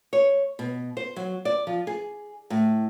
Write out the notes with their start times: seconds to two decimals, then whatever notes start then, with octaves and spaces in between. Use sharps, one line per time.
0.13 C#5
0.59 B2
0.97 C5
1.16 F#3
1.45 D5
1.67 F3
1.87 G#4
2.50 A2